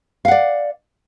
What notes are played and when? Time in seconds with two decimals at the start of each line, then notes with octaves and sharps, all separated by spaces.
0.25 F5
0.28 F#5
0.31 D5